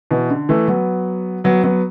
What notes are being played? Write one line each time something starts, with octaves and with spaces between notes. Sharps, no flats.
B2 E3
D3
E3 A3
F#3 B3
F#3 B3
F#3 B3